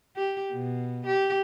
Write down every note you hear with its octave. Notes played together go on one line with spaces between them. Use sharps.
G4
B2
G4